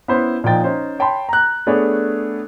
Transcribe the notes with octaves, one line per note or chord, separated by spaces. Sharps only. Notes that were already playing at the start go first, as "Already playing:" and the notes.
B3 C#4 E4 C5 B5
A#2 F3 D#4 G5 A6
C#4 D#4 C5
C#5 G5 A5 B5 C6
A#5 F#6
A3 B3 D4 G#4 C#5